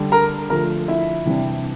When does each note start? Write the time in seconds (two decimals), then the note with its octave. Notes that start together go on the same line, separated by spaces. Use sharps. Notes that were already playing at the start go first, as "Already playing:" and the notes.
Already playing: D3 G3 D4
0.12 A#4 A#5
0.50 D3 F3 A3 A#4 A#5
0.88 E4 E5
1.25 C3 E3 G3 D4